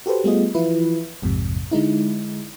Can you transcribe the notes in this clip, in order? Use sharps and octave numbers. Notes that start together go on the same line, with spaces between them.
F#4 G4 A4 B4 C5
G3 A3 B3 F4 G#4 D#5
E3 F3 E4 F4 B4
A#1 F2 G#2 C3
D3 G#3 D#4 E4